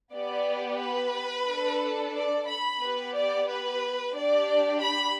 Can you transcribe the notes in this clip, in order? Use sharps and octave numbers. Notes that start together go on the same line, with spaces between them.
B3 G4 D5
B4
D4 A4
D5
B5
B3 G4 B4
D5
B4
D4 G4 D5
B5